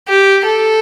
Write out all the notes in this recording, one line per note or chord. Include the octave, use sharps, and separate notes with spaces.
G4
A4